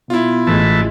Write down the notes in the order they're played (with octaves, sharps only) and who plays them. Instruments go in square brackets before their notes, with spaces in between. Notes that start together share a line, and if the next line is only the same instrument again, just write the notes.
[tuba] B2 [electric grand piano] E4 F4
[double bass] A1 G#3 [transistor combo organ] A2 E3 A5